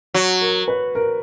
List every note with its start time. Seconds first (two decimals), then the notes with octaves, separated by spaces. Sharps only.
0.14 F#3 F#4
0.41 A#4
0.68 B4
0.95 A#4